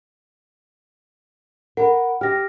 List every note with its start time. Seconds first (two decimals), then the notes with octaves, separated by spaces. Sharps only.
1.77 A#4 F#5 B5
2.21 G4 F6 A#6